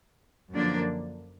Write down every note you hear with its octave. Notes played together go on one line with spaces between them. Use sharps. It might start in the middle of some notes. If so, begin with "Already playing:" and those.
F#2 D3 F3 A#3 D4